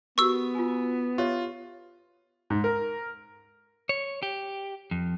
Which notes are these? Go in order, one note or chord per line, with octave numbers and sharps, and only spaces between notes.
B3 F#4 G4 A#4 C#6 E6
F4 G#5
F4 G4 C#5 E5
G#2
A#4
C#5
G4
F2